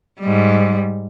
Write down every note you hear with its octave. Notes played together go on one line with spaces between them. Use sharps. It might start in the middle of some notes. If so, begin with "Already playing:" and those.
G#2 G3